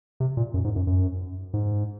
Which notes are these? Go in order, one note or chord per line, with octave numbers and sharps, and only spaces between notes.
C3
A#2
F#2
G#2
F#2
F#2
G#2